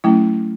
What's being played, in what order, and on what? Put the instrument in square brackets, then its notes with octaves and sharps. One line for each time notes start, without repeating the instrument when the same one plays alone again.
[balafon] F#3 A3 C#4 E4